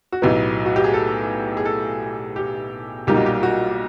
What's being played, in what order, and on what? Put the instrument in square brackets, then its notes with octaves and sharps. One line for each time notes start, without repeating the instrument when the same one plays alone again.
[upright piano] F#4
B1 A2 F#3 B3 G4
F#4
G4
G#4
A4
G#4
A4
G4
B1 A#2 G3 A#3 D#4 G4
F#4
G4
F#4